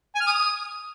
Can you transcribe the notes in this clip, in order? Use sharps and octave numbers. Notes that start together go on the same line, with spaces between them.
G#5
F6
D#6